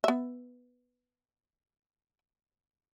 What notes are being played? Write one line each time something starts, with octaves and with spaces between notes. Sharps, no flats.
B3 E5